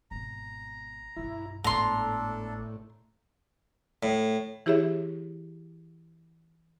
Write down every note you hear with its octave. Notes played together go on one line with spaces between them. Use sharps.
G#1 B2 A#5
B1 G2 E4
G#1 A2 B3 D4 A4 A#5 C6
A2
E3 E4 G4 G#4 C#5 E5